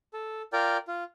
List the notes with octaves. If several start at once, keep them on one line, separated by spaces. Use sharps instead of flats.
A4
F4 A#4 D5 G5
F4